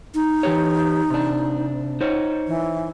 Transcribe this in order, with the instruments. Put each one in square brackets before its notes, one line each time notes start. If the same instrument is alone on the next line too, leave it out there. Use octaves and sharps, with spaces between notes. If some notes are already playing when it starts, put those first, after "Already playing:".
[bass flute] D#4
[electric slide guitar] E3 G4 C#5
C3 D4
D#4 C5 C#5
[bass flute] E3